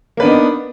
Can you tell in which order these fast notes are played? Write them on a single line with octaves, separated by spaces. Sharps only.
A#3 B4 D4 B3 D#4